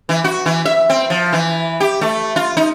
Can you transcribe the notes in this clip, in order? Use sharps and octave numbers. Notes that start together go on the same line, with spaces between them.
E3
F#4
E3
E5
C4
F3
E3
G4
A3
F4
D#4